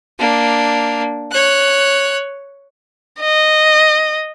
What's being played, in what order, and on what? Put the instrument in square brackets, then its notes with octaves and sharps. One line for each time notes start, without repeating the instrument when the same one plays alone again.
[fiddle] A#3 D4
C#5 F#6
[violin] D#5